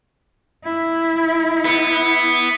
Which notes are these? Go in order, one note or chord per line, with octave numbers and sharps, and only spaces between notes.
E4
B3